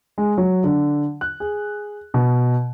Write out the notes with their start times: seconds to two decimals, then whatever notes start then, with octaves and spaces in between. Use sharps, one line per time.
0.18 G#3
0.38 F#3
0.64 D3
1.21 F#6
1.40 G#4
2.14 B2